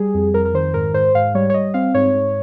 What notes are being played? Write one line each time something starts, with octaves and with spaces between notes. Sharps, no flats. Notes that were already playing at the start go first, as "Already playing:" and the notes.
Already playing: G3 G#4
F2
F2 A#4
A#4
D#3 C5
G#2 A#4
G#2 C5
G#2 F5
G3 C#5
C#5
G3 D#5
C4 F5
G#2 C#5
G#2